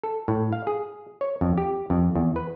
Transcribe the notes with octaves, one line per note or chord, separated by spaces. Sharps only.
A4
A2
F5
G#4
C#5
F2
G4
F2
E2
B4